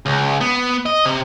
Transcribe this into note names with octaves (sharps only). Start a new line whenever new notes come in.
C#2
B3
D#5
C3